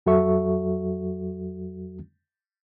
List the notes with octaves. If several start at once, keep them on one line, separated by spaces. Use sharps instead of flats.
F2 F#3 F#4 A4 E5 C#6